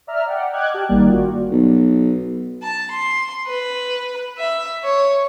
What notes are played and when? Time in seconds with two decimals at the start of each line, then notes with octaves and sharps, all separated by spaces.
0.07 D5 E5 A#5 F6
0.26 D5 F#5 G5
0.53 D#5 G5 D6 F6 F#6 G#6
0.74 G4 G5 A5
0.89 G#1 D#3 G3 A#3 D5
1.09 F4 F#4
1.51 B1
2.62 A5
2.91 C6
3.47 B4
4.38 E5
4.84 C#5